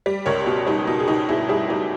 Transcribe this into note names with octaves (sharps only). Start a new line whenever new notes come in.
G3
C#2 A#4 C#5
B2
G3 D#4
B2 D#4
G#4
C#2 D#4 G4
B2 E4 G#4
G3 E4 G#4
G3 D#4 G4